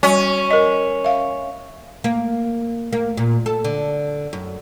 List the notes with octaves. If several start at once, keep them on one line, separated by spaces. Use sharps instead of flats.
G3 C#4 F#4 C#6
A#4 D#5
E5 F5
A#3
A#3
A#2
A4
D3
F#2